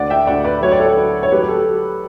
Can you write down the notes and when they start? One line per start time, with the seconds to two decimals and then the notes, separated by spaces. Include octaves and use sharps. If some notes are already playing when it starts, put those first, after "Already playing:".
Already playing: D2 D5 F#5
0.10 E5 G5
0.27 D2 D5 F#5
0.44 B4 D5
0.62 F#3 C#5
0.72 D5
0.80 A4 C#5
0.97 F#3
1.23 C#5
1.32 F#3 G4 B4
1.43 G4
1.49 A4